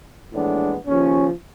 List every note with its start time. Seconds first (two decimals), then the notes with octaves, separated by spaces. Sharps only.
0.33 A#1 A2 E3 G#3 B3 D4
0.86 D#2 C#3 F3 C#4